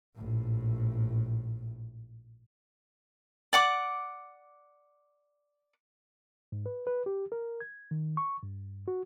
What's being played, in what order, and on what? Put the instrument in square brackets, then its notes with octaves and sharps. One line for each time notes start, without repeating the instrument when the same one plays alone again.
[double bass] A#1 A2
[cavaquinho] D5 F#5 D6
[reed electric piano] G#2
B4
B4
G4
A#4
G#6
D#3
C#6
G2
F#4